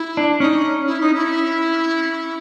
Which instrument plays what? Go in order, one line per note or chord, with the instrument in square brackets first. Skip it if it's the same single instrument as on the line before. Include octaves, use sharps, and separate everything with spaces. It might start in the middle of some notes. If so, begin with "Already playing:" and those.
Already playing: [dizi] E4
[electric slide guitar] D4
[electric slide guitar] C#4 [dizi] D#4
[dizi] E4
D#4
E4